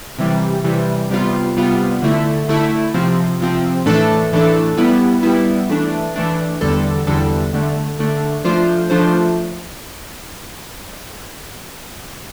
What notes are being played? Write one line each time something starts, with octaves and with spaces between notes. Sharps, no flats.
C3 E3 G3
C3 E3 G3
C3 G3 B3 F4
C3 G3 B3 F4
D3 A3 E4
D3 A3 E4
C3 F3 C4
C3 F3 C4
A2 E3 A3 D4 A4
A2 E3 A3 D4 A4
G3 B3 E4
G3 B3 E4
E3 A3 D4
E3 A3 D4
E2 D3 G3 D4 A4
E2 D3 G3 D4 A4
D3 A3 D4
D3 A3 D4
F3 A3 D4 F4 C5
F3 A3 D4 F4 C5